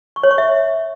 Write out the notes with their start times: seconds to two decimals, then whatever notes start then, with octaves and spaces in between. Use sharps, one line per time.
0.16 C#6
0.23 C#5
0.31 C#6
0.38 E5